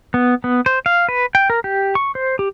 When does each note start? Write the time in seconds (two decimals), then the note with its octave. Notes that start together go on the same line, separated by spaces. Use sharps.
0.14 B3
0.44 B3
0.66 C5
0.86 F5
1.09 B4
1.35 G5
1.50 A#4
1.64 G4
1.95 C#6
2.15 C5
2.39 G4